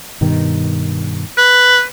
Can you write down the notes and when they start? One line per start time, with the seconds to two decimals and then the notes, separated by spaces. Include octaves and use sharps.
0.21 G2 B2 D#3
1.37 B4